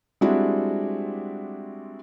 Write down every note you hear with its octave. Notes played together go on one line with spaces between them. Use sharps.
G3 G#3 C4 D4 E4 F#4